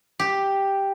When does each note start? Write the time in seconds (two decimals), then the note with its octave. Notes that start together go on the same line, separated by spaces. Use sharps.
0.19 G4